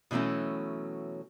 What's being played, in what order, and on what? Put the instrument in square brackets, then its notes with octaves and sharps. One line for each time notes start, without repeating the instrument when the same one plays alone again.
[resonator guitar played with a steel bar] B2 E3 F#3 A3 C#4